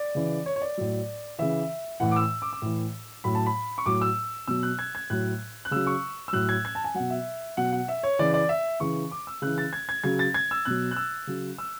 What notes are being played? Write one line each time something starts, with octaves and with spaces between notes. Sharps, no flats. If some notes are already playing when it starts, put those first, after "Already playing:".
Already playing: D5
C#3 E3
C#5
C#5
D5
A2 F#3
C#3 E3 E5
A2 E3 F#5
D6
E6
D6
D6
A2 E3
A2 F#3 B5
A5
B5
C#6
A2 F#3 D6
E6
B2 F#3 E6
F#6
G#6
G#6
A2 F#3 F#6
F#6
C#3 F#3 E6
C#6
E6
A2 F#3 F#6
G#6
G#6
A5
G#5
B2 F#3 F#5
E5
B2 F#3 F#5
F#5
E5
C#5
C#3 E3 D5
D5
E5
C#3 E3 C#6
D6
E6
C#3 E3 F#6
A6
G#6
G#6
C#3 F#3 G#6
A6
G#6
E6
B2 F#3 F#6
F#6
E6
C#3 F#3
E6